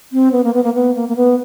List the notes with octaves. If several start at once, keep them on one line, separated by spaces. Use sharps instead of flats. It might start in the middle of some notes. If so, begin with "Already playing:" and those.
C4
B3
A#3
B3
A#3
B3
A#3
A#3
B3